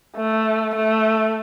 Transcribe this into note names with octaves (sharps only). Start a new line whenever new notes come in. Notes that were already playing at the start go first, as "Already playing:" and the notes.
A3
A3